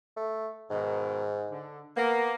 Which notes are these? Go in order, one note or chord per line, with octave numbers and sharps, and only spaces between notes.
A3
G#2 B2 D#3
D3
A#3 B3